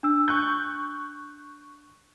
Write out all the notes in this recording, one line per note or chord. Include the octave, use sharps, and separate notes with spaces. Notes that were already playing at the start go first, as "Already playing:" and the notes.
D4 E6
C#6 F#6 G6